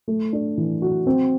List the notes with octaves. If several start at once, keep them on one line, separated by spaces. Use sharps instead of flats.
A3
D4
E3
F#4
C4